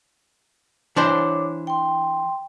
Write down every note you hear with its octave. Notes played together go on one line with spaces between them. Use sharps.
E3 D4 C5 C#5 D6
G5 C6